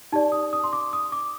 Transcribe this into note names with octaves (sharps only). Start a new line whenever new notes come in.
D#4 G4 D5 A5
D#6
D#6
C6
D6
D#6
D6